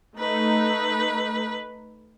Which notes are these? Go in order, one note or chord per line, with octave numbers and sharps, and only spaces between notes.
A3 D#4 B4